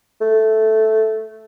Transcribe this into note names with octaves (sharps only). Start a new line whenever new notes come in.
A3